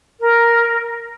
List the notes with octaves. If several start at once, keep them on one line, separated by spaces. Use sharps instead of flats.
A#4